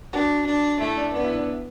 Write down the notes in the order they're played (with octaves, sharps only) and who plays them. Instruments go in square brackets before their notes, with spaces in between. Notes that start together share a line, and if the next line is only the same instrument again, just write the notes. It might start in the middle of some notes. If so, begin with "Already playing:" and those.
[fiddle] D4 [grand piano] F#4
[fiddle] D4
[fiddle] A3 [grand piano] E4
[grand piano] D4
[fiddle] B3 [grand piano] D4
[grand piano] E4
D4